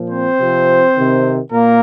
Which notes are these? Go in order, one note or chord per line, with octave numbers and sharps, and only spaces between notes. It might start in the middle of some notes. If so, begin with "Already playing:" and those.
Already playing: A#2 F3
C4 C5
C3 F3
C3 D#3
A#2 A#3 A#4